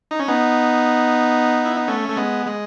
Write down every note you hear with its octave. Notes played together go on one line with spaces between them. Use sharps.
D#4
C#4
B3 D#4
E4
D#4
A3 C#4
A3
G#3 B3
G#3